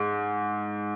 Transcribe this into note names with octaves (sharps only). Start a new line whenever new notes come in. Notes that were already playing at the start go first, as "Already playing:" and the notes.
Already playing: G#2